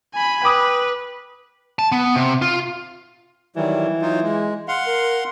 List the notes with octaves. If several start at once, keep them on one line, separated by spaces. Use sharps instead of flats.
G#5 B5
B4 G5 D6 D#6
A5
B3
C3
F4
D#3 E3 F#3 G3
F#3 D#4 F4
G#3
F5 F#5 C6
A#4